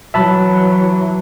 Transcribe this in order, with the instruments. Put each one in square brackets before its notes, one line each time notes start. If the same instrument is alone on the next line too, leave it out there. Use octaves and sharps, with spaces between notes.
[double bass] E3 F#3 [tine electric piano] E5 A5 B5